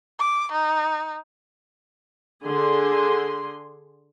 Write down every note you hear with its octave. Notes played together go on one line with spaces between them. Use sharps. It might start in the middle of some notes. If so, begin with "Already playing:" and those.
D6
D#4
D3 G#4 C6